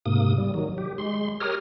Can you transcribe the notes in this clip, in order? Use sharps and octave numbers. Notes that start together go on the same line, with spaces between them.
G#2 C3 A#3 D#6
G3
D#3 F#3
G4
G#3 C6
G4 A#4 C#5 D#6 F6